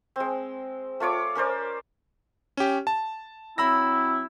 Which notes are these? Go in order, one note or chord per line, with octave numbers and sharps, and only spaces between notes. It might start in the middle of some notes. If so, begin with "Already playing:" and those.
G#3 C4
A3 F4 C#5 D6
C#4 A#4 C5 D5
C#4 G4
A5
F#3 C4 E4 B5 E6 A#6